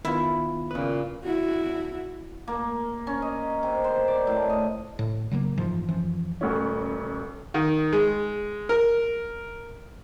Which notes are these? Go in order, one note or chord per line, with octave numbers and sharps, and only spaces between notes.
D#3 B3 E4 F4
A#2 C#3 B4
E4 F#4
A#3
C#4
D#5
C3
C5
D5
A2
D#5
A2
C#3 F#3 A3 A#3
F#1 G#2 E3 F3
F#2 E3 F3
D#1 D2 C#4
D#3
G#3
A#4